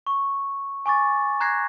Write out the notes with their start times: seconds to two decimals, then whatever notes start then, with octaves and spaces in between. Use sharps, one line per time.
0.07 C#6
0.86 G#5 C#6 D6 A6
1.40 A#5 F#6 G#6 A#6 C7